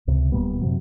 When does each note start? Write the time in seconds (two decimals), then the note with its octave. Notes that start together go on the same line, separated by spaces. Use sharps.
0.07 C#2 C3
0.32 D1 A#2 G3 B3
0.62 F#2 C3 F#3